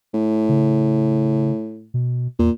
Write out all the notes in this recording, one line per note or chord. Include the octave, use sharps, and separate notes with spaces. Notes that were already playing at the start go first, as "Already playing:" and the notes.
A2
C#3
B2
E2 A#2